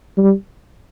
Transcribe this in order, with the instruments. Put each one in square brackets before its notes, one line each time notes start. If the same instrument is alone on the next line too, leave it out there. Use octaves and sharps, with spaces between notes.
[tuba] G3